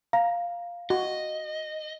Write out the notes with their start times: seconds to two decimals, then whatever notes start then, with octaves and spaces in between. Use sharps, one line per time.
0.13 F5 A#5
0.90 F#4 D#5